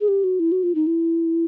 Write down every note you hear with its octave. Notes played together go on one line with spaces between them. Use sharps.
G#4
G4
F#4
E4
F#4
F4
D#4
E4